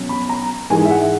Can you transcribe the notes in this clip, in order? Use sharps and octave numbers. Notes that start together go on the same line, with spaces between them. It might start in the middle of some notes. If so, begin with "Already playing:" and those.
Already playing: B2 F#3 C#4
B5
A#5
G#2 E3 G#3 G#5
E5
F#5